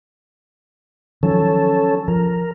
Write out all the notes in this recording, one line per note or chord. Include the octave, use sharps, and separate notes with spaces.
D#3 F3 F#3 C#4 A4
F3 A#4